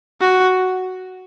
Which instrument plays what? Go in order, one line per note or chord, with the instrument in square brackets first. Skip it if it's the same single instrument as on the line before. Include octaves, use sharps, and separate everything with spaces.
[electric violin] F#4